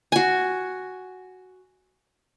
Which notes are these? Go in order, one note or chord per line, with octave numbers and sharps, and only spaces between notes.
F#4 G#5